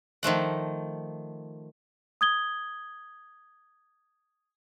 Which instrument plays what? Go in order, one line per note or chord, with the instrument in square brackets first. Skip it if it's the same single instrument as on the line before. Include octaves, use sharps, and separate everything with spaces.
[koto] D#3 F3 A3 F#5
[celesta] D#6 G#6 G7